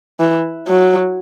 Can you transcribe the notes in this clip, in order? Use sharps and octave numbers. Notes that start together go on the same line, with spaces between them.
E3
F#3